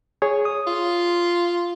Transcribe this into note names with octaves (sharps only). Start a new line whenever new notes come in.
G#4 C#5
D#6
F4